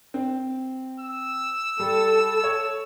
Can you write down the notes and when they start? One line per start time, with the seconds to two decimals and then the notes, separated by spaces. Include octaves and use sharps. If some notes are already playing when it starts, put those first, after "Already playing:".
0.14 C4
1.00 E6
1.80 G3 A4
2.44 C#5